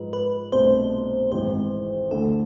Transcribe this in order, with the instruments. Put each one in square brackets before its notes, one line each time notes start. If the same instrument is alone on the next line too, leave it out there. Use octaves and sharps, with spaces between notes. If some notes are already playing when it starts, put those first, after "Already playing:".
Already playing: [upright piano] G#2 F3 G#3 [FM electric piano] B4
[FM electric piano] B4
[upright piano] C2 B2 A3 D4 [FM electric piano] C5
[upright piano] G#1 G#2 E3 G#3 C4 [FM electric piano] C5
[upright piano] D2 D3 A3 E4 [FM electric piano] A4